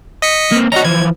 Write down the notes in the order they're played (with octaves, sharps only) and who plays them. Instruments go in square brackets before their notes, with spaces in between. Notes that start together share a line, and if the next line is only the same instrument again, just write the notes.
[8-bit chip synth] D#5 B6 C#7
[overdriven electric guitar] A#3 C4
[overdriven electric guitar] C#4 D#4 [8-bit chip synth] F#4 A#5
[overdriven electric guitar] E3 F3 [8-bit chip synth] G#6